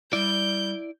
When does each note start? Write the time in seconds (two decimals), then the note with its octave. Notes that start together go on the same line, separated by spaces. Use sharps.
0.13 G3 E4 D5 G6